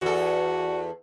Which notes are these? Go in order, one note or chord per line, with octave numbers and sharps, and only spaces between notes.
E2 F#4 A4